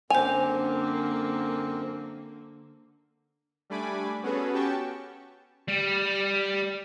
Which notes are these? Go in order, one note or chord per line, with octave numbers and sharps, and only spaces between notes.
F#2 D3 A#3 C4 C5 G#5 F7
G3 A3 D4 G#5 B5 D6
B3 C#4 F#4 G#4 A4 B4
C#4 F#4 G4 G5 A5 C#6
G3